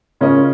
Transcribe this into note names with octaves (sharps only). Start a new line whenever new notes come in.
C#3 G#3 C#4 F4 A#4 D#5